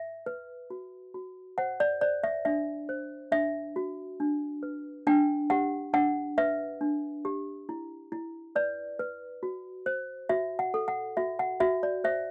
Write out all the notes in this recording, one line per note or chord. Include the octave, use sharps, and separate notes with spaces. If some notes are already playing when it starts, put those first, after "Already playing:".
Already playing: E5
B4
F#4
F#4
C5 F#5
D5
C5 D5
E5
D4 E5
C5
D4 E5
F#4
D4
B4
D4 G5
G4 F#5
D4 F#5
B4 E5
D4
G4
E4
E4
B4 D5
B4
F#4
C5
F#4 E5
F#5
A4
F#5
F#4 E5
F#5
F#4 E5
D5
C5 E5